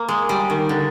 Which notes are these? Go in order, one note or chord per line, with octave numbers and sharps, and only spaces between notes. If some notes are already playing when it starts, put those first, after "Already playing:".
Already playing: A#3
G#3
G3
D#3
D3